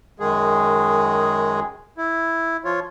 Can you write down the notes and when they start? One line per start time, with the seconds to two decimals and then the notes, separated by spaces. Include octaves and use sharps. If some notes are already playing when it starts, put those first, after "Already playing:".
0.20 F#2 D#3 G#3 G#4
1.98 E4
2.65 F3 F4 C#5